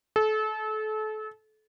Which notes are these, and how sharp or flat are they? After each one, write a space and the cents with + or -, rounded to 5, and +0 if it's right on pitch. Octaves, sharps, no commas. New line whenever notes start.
A4 -30